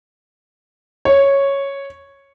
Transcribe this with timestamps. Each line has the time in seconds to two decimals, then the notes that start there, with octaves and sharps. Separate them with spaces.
1.05 C#5